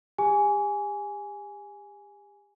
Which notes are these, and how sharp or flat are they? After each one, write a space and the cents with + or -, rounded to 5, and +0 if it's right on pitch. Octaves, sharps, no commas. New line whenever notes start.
G4 +40 G#5 +0 D6 -40